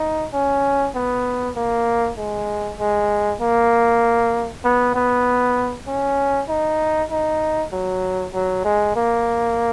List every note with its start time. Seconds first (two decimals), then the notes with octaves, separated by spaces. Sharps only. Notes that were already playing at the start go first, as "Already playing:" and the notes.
Already playing: D#4
0.33 C#4
0.95 B3
1.56 A#3
2.18 G#3
2.79 G#3
3.41 A#3
4.64 B3
4.95 B3
5.87 C#4
6.49 D#4
7.11 D#4
7.73 F#3
8.34 F#3
8.64 G#3
8.96 A#3